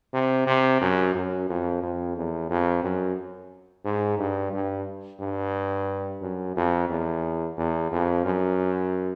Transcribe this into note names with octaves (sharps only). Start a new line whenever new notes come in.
C3
C3
F#2
F#2
F2
F2
E2
F2
F#2
G#2
G2
G2
G2
F#2
F2
E2
E2
F2
F#2